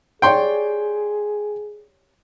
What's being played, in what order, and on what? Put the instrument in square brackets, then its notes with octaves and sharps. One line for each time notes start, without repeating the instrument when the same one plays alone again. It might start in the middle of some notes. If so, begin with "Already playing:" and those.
[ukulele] G4 C#5 D5 [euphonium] G#4 [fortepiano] G5 C6